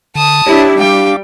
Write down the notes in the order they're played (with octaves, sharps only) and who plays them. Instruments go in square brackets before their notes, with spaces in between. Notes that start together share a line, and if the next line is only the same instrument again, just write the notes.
[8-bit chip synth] D3 [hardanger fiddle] A5 D#6
[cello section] D4 E4 [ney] G4 [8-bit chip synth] C#5
[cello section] G3 [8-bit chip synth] D4 F5 D6 [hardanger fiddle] G5